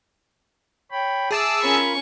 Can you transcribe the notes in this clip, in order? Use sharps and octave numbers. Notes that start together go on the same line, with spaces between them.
C#5 G5 B5
G#4 E5 A5 D6 E6
C#4 F4 A#4 B5 C#6